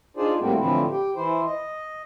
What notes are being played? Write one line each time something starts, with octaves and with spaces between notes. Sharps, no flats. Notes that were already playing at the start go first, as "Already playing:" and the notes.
D4 D#4 F4 G#4 C5 D5
A2 G3 A3 A#3 C4 F#4
A2 D3 E3 F3 C4 E4
G4
E3 E4 C5
D#5